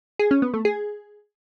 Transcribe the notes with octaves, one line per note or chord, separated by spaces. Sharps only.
G#4
C#4
B3
A3
G#4